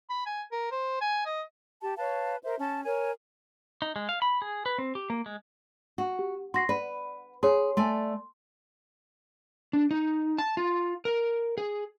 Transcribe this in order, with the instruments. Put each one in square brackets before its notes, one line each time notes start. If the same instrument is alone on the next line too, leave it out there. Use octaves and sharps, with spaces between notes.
[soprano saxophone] B5
G#5
A#4
C5
G#5
D#5
[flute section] G4 A5
B4 C#5 F5 A5
A#4 C5 E5
C#4 A5
A#4 C#5 G#5
[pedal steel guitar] D#4
G#3
F5
B5
G#4
B4
C4
G4
A#3
G#3
[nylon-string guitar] F#4
[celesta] G4
[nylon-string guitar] F#4 [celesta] C6 A#6 C7
[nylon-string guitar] B4 [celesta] D5
[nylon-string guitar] G#4 [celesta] C#5 C6
[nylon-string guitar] A3 D5 G#5 [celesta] C6
[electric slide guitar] D4
D#4
A5
F4
A#4
G#4